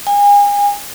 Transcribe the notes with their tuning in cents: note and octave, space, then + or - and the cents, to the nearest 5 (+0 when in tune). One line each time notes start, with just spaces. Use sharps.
G#5 -35